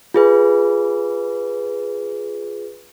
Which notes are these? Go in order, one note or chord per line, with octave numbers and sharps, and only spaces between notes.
F4 G#4 B4